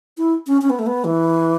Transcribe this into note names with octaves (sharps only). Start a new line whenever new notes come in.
E4
C#4
C#4
B3
A3
B3
E3